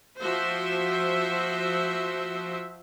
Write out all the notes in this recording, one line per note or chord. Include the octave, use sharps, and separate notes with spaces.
F3 F#4 C5 E5